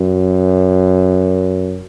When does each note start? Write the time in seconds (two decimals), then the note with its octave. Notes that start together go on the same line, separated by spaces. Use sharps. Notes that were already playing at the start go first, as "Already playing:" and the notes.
Already playing: F#2